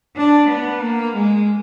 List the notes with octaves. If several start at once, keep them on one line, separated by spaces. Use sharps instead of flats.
D4
B3
A#3
G#3